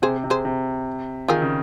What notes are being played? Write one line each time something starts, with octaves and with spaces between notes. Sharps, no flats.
C3 G#4 C5
C3
G#4 C5
C3
D#3 F4 G#4
C#3